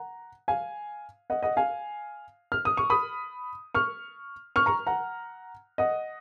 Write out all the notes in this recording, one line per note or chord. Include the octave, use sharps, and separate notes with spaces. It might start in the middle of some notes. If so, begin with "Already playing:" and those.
Already playing: F#5 A#5
F5 G#5
D#5 F#5
D#5 F#5
F5 G#5
F6
D#6
C#6
B5 D#6
C#6 F6
C#6 F6
A#5 C#6
F#5 A#5
D#5 F#5